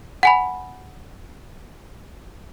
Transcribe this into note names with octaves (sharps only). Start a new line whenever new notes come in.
F#5 G#5 B5